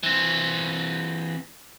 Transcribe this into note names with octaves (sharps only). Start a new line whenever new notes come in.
E3 C4